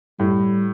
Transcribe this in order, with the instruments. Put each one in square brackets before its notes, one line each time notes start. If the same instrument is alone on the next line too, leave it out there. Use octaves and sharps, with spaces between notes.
[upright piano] A2 [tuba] G3